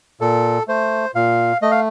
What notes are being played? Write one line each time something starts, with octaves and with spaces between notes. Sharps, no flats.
A#2 A4
A3 C5
A#2 F5
A3 D#5
F5